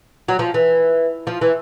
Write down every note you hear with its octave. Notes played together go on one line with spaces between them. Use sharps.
F#3
F3
E3
F3
E3